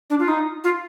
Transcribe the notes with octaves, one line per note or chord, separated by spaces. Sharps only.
D4
F4
D#4
F4